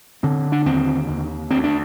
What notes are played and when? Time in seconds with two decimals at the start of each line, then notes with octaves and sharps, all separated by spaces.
0.23 D3 C4
0.52 D4
0.66 D#2 C4
1.08 D#2
1.51 D2 C4
1.64 D4